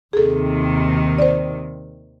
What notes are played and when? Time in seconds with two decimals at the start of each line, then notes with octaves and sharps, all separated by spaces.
0.13 D#2 C3 D#3 G#4 A4
1.19 C5 D5